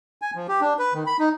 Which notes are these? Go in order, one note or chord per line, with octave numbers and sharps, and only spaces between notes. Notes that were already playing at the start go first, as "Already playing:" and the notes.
G#5
F3
G4
D4
B4
D#3
B5
D#4